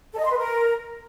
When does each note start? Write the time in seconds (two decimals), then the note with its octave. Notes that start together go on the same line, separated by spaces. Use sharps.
0.13 A4
0.19 D#5
0.25 C6
0.32 B4
0.38 A#4